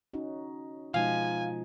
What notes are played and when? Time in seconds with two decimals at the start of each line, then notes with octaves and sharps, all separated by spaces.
0.13 C#4 D#4 F#4
0.94 B2 F3 G#3 D#4 F5 G#5